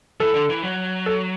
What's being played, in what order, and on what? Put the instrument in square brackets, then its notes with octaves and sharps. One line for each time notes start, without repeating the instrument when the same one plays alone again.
[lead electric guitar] E3 [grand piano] A4
[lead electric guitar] D3
E3
F#3
[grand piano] A4